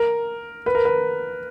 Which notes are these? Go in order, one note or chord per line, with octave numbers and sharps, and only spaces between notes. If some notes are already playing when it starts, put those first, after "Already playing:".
Already playing: A#4
B4
A#4
B4